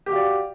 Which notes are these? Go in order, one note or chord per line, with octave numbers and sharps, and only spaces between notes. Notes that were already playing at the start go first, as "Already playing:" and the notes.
F#4 G4 D5 F5